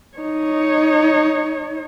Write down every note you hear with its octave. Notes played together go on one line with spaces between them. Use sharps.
D#4 C#5